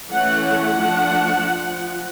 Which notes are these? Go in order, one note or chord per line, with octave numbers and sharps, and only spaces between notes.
E3 A3 C#4 F#5
F#5
F3 A3 D4
F3